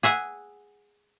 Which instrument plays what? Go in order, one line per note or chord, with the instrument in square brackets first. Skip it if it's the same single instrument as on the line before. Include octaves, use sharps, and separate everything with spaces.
[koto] G#4 E5 F#5